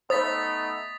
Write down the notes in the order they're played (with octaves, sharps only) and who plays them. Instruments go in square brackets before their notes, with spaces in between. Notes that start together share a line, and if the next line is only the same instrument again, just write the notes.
[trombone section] A3 B3 D#4 [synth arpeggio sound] C5 B5 [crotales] D#6 A6 B6